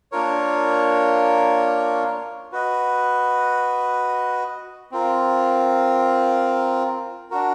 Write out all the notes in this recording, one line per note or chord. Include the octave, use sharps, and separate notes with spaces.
A#3 D4 F4 A#4 C#5
F#4 B4 D#5
C4 F4 A#4
D4 F#4 A#4